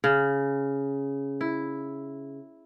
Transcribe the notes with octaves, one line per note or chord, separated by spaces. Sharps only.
C#3
E4